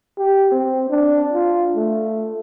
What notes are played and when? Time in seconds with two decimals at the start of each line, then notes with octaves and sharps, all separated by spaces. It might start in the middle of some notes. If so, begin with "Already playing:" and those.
0.18 G4
0.52 C4
0.90 D4
1.33 F4
1.75 A3